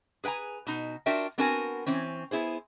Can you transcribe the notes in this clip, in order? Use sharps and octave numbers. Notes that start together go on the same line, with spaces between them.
G#4 B4 G5 G#5 A#5
B2 D#4
D4 F4 F#4 A#4 E5 G5
B3 C4 D4 F#4 A#4 G#5
E3 C4 C#4
B3 E4 G#4 C5